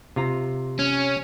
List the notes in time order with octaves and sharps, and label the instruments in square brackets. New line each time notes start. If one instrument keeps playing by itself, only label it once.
[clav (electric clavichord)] C3 F4 A#5
[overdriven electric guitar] C#4